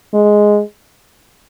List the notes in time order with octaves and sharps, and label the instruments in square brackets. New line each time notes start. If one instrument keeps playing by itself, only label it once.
[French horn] G#3